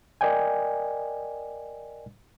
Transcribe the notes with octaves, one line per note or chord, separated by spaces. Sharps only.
A#4 D5 D#5 G5 G#5